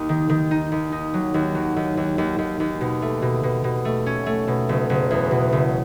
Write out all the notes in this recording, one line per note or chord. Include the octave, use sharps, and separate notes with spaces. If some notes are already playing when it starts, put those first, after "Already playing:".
Already playing: D#2 D#4
D#3
D#3
D#4
D#2
D#4
F#3
D#2
F#3
D#2
D#2
D#2
D#2
D#2
B2
A3
B2
B2
B2
A3
C#4
A3
B2
F#1
F#1
E2
B2
F#1